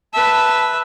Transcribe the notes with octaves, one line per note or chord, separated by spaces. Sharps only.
B4 E5 A5